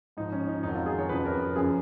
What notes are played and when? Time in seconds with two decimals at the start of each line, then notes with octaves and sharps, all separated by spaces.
0.17 G#2 F3 D#4
0.32 C#4
0.47 D#4
0.63 F2 D#3 F#3 D#4
0.75 F4
0.86 G#4
0.99 C#5
1.09 F2 C#3 F3 B4
1.25 A#4
1.40 A#4
1.56 F#2 C#3 F3 G#4